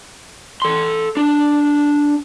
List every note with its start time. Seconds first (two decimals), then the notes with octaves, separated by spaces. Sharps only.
0.62 A4 C6
1.17 D4